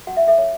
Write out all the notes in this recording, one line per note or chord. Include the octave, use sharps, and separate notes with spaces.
F#4 F#5
E5
A4 C#5 E5
C#5